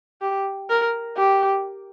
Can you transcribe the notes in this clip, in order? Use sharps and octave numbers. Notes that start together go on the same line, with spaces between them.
G4
A#4
G4